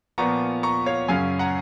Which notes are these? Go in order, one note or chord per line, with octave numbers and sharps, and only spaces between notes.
A#2 F3 B3 A#5 C#6
A#5 C#6
C#5 F5
F#2 C#3 F#3 C#4 F5 G#5
F#5 A#5